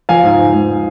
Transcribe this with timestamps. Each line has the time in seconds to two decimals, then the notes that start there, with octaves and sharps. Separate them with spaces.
0.09 F3 F5 G#5
0.23 G#2
0.39 G#2
0.54 G#2